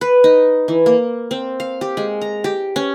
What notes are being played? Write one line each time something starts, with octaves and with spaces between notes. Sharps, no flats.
B4
D#4
E3
A#3
C4
F5
G4
G#3
A#5
G4
C#4